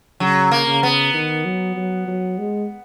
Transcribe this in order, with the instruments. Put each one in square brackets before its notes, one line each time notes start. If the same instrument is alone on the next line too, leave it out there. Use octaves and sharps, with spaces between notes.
[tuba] C#3 [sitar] F#3
[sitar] A#3
[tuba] C#3
[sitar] B3
[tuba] D#3
F#3
F#3
F#3
G#3